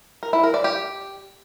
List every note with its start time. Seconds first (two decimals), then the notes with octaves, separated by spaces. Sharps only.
0.23 A#4
0.33 E4
0.43 A#4
0.54 D5
0.64 G4